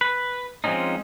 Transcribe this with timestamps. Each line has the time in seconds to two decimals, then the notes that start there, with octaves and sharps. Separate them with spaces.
0.01 B4
0.64 F3 G#3 C4 C#4 D#4